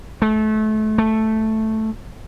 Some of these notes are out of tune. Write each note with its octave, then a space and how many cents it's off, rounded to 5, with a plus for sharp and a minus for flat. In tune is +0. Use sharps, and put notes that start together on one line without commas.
A3 -30
A3 -5